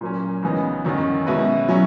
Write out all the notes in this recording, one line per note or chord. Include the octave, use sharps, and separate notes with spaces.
A#2 F#3 A#3 C#4
C#2 C#3 E3 B3 D#4
F#2 D#3 F#3 C#4 F#4
B2 G#3 C#4 E4 B4
F#3 C#4 E4